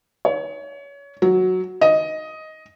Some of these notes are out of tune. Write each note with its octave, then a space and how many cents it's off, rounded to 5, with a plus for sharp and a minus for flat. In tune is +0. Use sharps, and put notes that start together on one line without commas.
C#5 +25
F#3 -5
D#5 +10